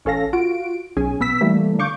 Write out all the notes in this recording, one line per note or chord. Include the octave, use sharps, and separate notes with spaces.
A1 C#4 A4 F5 A#6
F4 F#4 D7
B1 C#4 G#4 G#5
B1 B3 E6 B6
E3 G3 A3 A#3
D3 F5 C#6 D6 G6